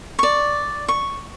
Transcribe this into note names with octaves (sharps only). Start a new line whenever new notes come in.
D5 C#6
C#6